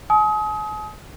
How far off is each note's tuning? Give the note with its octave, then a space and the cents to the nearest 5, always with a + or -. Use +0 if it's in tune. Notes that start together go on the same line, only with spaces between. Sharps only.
G#5 +45 D#6 +30